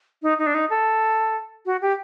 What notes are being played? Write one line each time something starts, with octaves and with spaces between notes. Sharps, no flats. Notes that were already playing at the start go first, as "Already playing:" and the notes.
D#4
D#4
D4
D#4
A4
F#4
G4